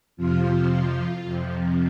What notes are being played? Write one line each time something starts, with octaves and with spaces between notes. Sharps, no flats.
F2 C3 F3 F4
F2 C3 F3